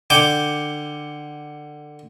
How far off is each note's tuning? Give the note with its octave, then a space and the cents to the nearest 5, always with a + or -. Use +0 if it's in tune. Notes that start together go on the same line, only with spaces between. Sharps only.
D3 +20 G5 +0 D6 +0